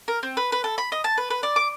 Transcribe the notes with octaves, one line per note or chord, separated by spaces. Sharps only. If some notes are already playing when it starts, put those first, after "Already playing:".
A#4
C4
B4
B4
A4
B5
D#5
A5
B4
B4
D5
D6